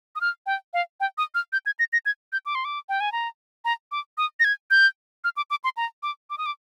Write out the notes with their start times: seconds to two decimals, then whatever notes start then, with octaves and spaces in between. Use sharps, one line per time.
0.16 D#6
0.21 F6
0.46 G5
0.73 F5
1.00 G5
1.18 D#6
1.35 F6
1.53 G6
1.66 G#6
1.79 A#6
1.93 A#6
2.06 G#6
2.33 G6
2.46 D6
2.55 C6
2.65 D6
2.89 G5
3.00 G#5
3.12 A#5
3.65 A#5
3.92 D6
4.18 D#6
4.40 A#6
4.44 G#6
4.71 G6
5.24 F6
5.37 D6
5.50 D6
5.64 C6
5.77 A#5
6.03 D6
6.30 D6
6.38 D#6
6.46 D6